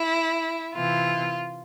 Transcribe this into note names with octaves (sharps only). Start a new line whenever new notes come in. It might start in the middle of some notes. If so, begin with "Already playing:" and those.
Already playing: E4
C3 E3 F4